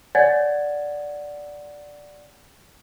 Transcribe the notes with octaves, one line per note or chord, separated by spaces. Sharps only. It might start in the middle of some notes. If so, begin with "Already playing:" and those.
C#5 D5 F#5 G#5 G#6 A6